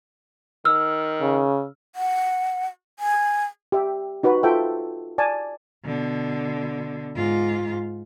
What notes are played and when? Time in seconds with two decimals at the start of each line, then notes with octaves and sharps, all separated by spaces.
0.65 D#3 E6 F6
1.21 C#3
1.95 F#5
2.99 G#5
3.72 G4 E5
4.23 D#4 F#4 B4
4.43 F4 A4 C5 E5 G5
5.18 D5 G#5 A5
5.84 B2 D3
7.15 G#2 F4